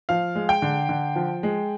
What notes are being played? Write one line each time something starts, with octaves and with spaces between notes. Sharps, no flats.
F3 F5
G#3
G5
D3
D3
F3
G#3